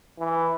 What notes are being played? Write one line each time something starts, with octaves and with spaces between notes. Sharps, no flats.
E3